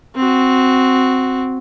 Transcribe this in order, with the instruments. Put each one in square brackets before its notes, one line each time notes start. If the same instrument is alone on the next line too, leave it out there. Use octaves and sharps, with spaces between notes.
[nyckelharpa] C4 F#4